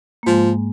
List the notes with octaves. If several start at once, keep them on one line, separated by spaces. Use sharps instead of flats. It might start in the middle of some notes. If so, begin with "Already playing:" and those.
A#3
G#2 F3 G#3